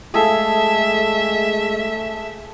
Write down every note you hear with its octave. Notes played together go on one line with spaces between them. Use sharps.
G#3 A3 G#4 A4 E5 F5